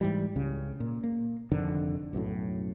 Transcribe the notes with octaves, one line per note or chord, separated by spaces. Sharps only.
G#2 E3 G3
C#2 C#3
A#2
A#3
F1 F2 D3 D#3
B1 F#2 A2